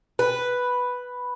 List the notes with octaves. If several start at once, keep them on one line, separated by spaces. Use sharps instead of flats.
B4